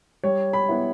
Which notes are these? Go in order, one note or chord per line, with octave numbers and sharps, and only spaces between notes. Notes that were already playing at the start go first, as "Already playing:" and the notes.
G3 C#5
B5
B3 E4